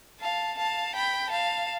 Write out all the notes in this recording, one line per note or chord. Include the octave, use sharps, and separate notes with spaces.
F5 A5
F5 A5
G5 B5
F5 A5